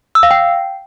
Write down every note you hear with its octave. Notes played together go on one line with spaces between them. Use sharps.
E6
F5
G5